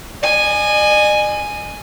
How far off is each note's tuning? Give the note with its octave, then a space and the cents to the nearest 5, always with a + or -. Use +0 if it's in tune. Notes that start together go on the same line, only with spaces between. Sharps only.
D#5 -45 G#5 +0